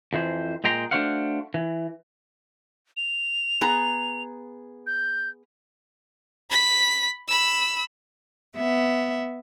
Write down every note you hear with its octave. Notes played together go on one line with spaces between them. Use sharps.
F2 E3 C5
A#2 G#3 G5 A#5 C6
A3 D4 F#4 C5 F5 F#5
E3
F7
B3 G#4 A#5
G6
B5 B6
B5 E6
B3 E5